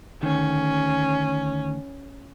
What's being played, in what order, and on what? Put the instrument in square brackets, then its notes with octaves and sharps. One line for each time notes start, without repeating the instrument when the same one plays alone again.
[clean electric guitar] D2 D#3 [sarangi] C#4